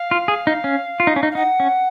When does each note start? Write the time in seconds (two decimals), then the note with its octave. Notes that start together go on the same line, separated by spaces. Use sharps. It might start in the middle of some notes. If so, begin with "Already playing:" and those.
Already playing: F5
0.11 F4
0.28 G#4
0.47 D#4
0.64 C#4
1.00 F4
1.07 D#4
1.16 C#4
1.23 D#4
1.31 F5
1.35 D#4 F#5
1.60 C#4